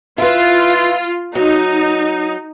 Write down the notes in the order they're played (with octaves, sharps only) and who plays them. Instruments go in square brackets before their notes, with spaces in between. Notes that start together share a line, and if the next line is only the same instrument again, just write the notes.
[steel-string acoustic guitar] E4 B4 [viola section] F4
[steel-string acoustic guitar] F#3 [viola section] D#4